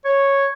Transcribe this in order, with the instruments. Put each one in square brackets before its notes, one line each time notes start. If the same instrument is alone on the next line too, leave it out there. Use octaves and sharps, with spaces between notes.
[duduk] C#5